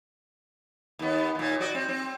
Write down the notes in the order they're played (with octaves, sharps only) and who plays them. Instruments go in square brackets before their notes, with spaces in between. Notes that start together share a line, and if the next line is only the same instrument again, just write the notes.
[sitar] D#2 B3
D#2 A#2
F#4 D5 D#5
C4
C4